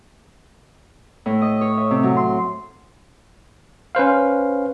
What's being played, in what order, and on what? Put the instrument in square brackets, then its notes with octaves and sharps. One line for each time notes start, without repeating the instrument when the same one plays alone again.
[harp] A2
D#5
C#5
E5
C3
F#3
C6
[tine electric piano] C#4 B4 C5 F5